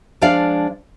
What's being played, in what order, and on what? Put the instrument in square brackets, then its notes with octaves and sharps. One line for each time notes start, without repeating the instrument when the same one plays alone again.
[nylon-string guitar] F3 G#3 D4 D5 F5